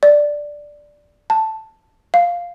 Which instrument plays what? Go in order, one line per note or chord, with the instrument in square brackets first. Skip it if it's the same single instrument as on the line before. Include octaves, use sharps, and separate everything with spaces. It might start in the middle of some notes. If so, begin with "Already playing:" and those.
[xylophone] D5
A5
F5